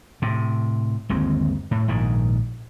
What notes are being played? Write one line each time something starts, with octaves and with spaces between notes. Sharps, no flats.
A2 C3
G1 D#2 G#3 C4
A2
A#1 G#2 D#3